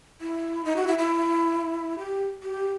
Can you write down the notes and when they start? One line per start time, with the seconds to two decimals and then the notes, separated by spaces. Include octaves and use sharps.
0.21 E4
0.65 D#4
0.76 F#4
0.87 E4
0.98 E4
1.98 G4
2.43 G4